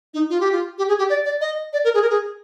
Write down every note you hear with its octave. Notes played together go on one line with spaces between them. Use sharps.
D#4
F4
G4
F4
G4
G#4
G4
D5
D5
D#5
D5
A#4
G#4
A#4
G#4